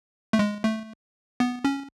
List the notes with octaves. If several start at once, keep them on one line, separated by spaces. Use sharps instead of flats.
A3
G#3
A3
B3
C#4